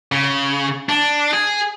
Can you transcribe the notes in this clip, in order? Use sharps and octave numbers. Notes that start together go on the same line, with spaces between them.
C#3
D4
G#4